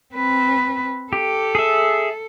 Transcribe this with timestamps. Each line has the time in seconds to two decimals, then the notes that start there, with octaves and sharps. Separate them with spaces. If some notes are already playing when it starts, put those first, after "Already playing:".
0.15 C4 B4
1.13 G4 A4
1.55 G#4 E5